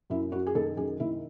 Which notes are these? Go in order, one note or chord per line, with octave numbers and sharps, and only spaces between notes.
F#2 E4
F#2 F#4
G#4
D#3 A4
F#2 G#4
D#3 E4